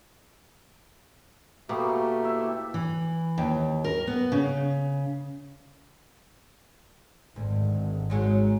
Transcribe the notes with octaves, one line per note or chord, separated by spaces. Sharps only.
B2 A3 A#3 G4
E4 E5
E3
D#2
A#4
B3
C#3
G#1 D2
G#2 F#3 G#3